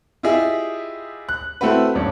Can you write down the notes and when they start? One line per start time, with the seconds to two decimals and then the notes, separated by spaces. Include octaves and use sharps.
0.23 E4 F4 G4 G#4 D#5 E5
1.29 F#6
1.61 A3 C4 E4 F#4 B4
1.95 D#1 G2 C#4 D4